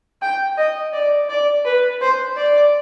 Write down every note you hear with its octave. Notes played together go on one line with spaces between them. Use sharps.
G5
D#5
D5
D5
B4
C5
D5